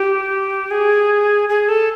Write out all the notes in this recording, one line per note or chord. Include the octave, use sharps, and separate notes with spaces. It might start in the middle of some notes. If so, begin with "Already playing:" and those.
Already playing: G4
G#4
G#4
A4